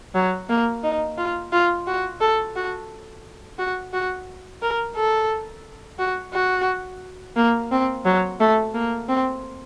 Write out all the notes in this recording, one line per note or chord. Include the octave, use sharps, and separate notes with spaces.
F#3
A#3
D#4
F4
F4
F#4
A4
F#4
F#4
F#4
A#4
A4
F#4
F#4
A#3
C4
F#3
A3
A#3
C4